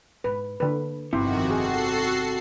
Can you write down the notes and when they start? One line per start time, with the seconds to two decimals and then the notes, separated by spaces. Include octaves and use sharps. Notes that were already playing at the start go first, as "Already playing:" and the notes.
0.24 G#2 B4
0.60 D3 A#3 B4
1.13 G1 F2 C3 D#3 E4 F#4
1.50 F#4 G#4 A4 C7